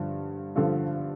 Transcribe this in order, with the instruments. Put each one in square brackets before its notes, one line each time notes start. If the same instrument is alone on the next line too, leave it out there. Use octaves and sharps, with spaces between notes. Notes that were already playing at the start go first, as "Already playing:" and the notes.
Already playing: [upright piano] G2 D3 F3
G2 D3 F3 F4 A4